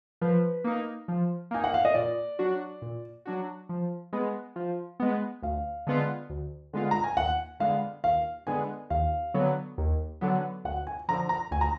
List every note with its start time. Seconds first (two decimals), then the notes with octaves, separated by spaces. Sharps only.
0.21 F3 B4
0.64 A#3 D#4
1.08 F3
1.51 A#3 D#4 G#5
1.64 F#5
1.74 F5
1.85 D#5
1.95 A#2 D5
2.39 F#3 D4 F#4
2.82 A#2
3.25 F#3 D4 F#4
3.69 F3
4.13 G#3 B3
4.56 F3
5.00 G#3 B3
5.42 D2 F5
5.87 D3 G#3 B3 F4
6.30 D2
6.73 D3 G#3 B3 F4
6.91 A#5
7.04 G#5
7.17 D#2 F#5
7.60 D3 G#3 B3 F5
8.04 D#2 F5
8.47 D3 G#3 B3 G#5
8.90 D#2 F5
9.34 D3 F#3 B3
9.78 D#2
10.21 D3 F#3 B3
10.64 D2 F#5
10.87 G#5
11.08 D3 F3 A#5
11.29 A#5
11.51 D2 G#5
11.61 A#5